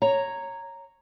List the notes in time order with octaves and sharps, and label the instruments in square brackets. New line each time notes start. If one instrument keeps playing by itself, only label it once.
[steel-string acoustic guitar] C#5 A#5